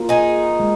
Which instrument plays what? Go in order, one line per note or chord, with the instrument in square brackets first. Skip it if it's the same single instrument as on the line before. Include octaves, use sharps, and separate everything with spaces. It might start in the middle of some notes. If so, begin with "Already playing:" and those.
Already playing: [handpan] A#3 F4 A#4
[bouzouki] D#4 G#4
[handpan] G#3